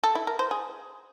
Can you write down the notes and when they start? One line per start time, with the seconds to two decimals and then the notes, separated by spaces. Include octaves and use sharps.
0.04 A4
0.15 E4
0.27 A#4
0.39 C5
0.51 G#4